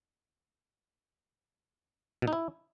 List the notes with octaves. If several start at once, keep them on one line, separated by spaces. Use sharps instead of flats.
B2
D#4
E4